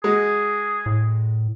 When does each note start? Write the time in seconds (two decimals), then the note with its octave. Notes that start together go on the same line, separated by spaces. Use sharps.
0.04 G#3 F#4 G#4
0.86 A2